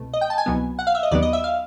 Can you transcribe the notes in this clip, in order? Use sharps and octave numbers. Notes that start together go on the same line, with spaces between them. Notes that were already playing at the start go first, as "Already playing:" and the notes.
Already playing: C2 B2 A3
D#5
G5
A5
G#5
C2 B2 F#3 B3
F#5
F5
E5
D#5
D#2 D#3 F#3 B3 D5
D#5
E5
F5